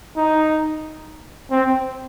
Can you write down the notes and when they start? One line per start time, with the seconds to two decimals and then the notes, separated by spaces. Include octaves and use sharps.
0.17 D#4
1.51 C4